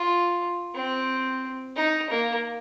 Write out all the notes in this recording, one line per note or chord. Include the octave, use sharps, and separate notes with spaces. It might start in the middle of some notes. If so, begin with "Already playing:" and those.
Already playing: F4
C4
D#4
A#3